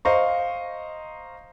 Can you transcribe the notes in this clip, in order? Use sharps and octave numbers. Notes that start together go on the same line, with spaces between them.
C5 D#5 F5 A#5 C#6